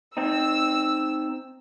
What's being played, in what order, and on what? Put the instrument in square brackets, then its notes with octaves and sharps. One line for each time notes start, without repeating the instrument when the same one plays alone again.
[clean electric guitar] C4 D#4 [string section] E6